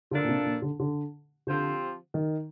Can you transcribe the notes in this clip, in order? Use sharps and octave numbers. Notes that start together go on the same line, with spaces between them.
D3 F3 A#3 D4 A4
A#2
C3
A#2
D3
D3
D3 F3 C4 G4 C5
D#3